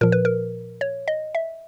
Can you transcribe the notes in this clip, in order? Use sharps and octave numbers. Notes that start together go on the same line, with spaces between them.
A#2 F3 A#4
B4
A#4
C#5
D#5
E5